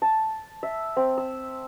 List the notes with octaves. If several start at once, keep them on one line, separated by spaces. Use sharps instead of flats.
A5
E5
C4
E6